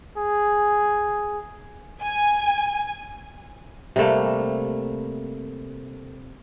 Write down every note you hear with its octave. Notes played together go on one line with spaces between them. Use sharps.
G#4
G#5
C3 G3 A3 A#3